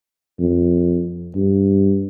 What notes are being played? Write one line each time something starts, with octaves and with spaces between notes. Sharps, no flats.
F2
G2